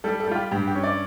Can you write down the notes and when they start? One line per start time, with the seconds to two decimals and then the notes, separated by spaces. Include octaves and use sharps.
0.04 G3 A4
0.20 A4
0.28 G3 F4
0.36 G4
0.51 G2 G4
0.67 G4
0.75 C#4
0.84 D5